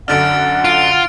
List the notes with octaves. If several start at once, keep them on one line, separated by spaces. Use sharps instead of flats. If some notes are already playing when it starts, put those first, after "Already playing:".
F#2 D3 D4 F#5 F6 A6 D7
F4 D7